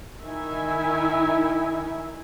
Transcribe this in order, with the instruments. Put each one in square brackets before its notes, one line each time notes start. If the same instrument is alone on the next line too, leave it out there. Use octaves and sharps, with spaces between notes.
[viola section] D#3 D#4 E4 E5 G#5